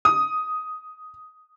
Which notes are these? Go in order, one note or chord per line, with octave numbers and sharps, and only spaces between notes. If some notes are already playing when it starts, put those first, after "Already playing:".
D#6